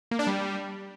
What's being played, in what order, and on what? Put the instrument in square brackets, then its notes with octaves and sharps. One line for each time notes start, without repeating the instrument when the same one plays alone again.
[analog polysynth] A#3
D4
G3